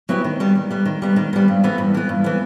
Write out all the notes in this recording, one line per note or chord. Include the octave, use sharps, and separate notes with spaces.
F#3 B3 E4 G4
D#3
G3 B3
D#3
G3 B3
D#3
G3 B3
D#3
G3 B3
G2
E3 B3
G2
E3 B3
G2
E3 B3